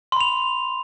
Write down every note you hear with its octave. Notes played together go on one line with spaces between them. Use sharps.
B5 C6 F7